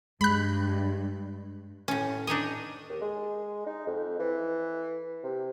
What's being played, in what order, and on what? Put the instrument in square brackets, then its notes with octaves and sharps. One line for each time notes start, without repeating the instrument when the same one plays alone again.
[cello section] G2 [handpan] G#3 [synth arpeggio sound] B5 F#6
[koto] A2 C#4
D4 D#4 C#5 D#5
[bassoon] D#2
G#3
D#4
F2
E3
C3